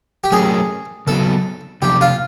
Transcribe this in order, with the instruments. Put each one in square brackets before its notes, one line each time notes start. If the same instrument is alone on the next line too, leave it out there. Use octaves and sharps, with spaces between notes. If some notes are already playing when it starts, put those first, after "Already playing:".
[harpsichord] G4
[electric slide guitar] F#3 A3 C#4 F#4 A#4 [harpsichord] G#4
[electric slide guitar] C#3 F#3 B3 D#4 F#4 [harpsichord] A4
[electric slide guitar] C3 F3 A#3 D4 [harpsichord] G4
[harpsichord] F4